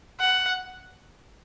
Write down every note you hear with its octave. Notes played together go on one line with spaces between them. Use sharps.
F#5